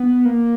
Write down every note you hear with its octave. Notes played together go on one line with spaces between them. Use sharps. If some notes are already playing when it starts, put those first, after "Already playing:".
Already playing: B3
A#3